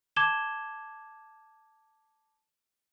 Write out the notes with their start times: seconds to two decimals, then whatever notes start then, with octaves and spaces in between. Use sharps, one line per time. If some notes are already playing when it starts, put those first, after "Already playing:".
0.16 A5 D6 G#6 E7 G7